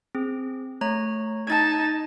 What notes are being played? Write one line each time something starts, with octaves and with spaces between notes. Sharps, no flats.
C4 G#4
A3 C#5 A#5
D#4 A5 G#6 A6